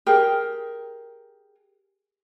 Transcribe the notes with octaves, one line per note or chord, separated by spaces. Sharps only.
G4 G#4 A#4